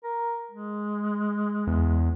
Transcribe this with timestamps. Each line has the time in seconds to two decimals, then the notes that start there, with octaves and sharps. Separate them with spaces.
0.04 A#4
0.51 G#3
1.67 E2